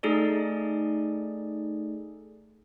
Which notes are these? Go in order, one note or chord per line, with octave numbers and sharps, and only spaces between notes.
A3 D#4 G#4 A4 D5